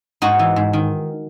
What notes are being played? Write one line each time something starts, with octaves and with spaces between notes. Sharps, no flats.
G#2 D#4 F#4
E3
G#2
D#3